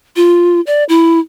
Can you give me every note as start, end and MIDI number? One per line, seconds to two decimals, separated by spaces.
0.16 0.61 65
0.67 0.84 74
0.89 1.19 64